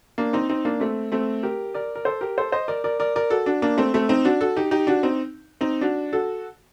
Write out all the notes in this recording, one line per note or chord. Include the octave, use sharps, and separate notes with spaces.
A#3 D4
C4 D#4
C4 D#4
A#3 D4
A3 C4
A3 C4
G4 A#4
A#4 D5
A#4
A4 C5
G4 A#4
A4 C5
C5 D#5
A#4 D5
A#4 D5
A#4 D5
A#4 D5
F#4 A4
D4 F#4
A#3 D4
A3 C4
A3 C4
C4 D#4
D4 F#4
F#4 A4
D#4 G4
D#4 G4
D4 F#4
C4 D#4
C4 D#4
D4 F#4
F#4 A4